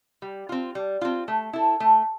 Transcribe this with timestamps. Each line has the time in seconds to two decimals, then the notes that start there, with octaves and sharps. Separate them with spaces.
0.22 G3
0.49 C4 F4
0.75 G3
1.01 C4 F4
1.28 A3
1.53 E4 A4
1.80 A3